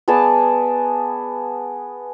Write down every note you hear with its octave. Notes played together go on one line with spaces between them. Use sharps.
B3 G#4 D5 A5